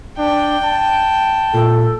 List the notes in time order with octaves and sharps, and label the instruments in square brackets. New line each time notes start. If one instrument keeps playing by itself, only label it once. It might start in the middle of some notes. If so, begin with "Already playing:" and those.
[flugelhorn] D4 [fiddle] G5
[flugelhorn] A5
[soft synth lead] A#2 [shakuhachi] A4